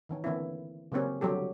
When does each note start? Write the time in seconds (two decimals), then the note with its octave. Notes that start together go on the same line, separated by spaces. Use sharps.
0.09 D#3 E3 C#4
0.24 D3 E3 A#3 C4 C#4 E4
0.92 C#3 F#3 A#3 C4 C#4 G4
1.21 D3 F#3 G3 G4 A4